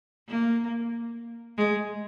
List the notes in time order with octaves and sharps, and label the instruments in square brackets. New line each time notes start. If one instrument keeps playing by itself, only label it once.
[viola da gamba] A#3
G#3